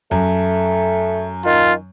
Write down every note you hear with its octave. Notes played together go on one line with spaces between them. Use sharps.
F#2 A3
D#3 F4